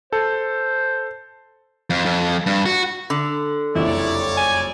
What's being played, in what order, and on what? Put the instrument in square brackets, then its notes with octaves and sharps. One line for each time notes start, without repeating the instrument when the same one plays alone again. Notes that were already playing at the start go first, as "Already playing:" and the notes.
[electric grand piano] A4 [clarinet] C5
[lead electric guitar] F2
F2
G2
F#4
[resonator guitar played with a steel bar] D3
[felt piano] F#1 C2 F2 [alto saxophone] E4 [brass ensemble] C#5 D5
[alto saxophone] G#5